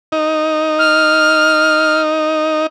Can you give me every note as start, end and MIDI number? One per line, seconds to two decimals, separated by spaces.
0.12 2.67 63
0.79 2.01 89